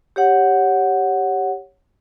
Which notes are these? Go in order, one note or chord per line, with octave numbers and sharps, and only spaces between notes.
G4 C#5 F#5